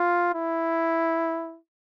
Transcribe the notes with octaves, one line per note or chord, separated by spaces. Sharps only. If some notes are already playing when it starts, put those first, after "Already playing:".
Already playing: F4
E4